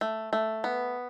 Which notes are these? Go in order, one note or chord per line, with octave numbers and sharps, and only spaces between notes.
A3
A3
B3